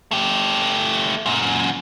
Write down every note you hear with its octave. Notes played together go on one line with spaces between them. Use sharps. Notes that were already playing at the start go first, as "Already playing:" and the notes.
A3 G4
F#2 A#2